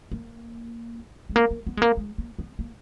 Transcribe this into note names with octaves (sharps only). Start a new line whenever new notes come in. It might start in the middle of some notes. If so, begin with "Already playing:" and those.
A#3
G#3
A#3
A#3
B3
G#3
A#3
G#3
A#3
B3
A#3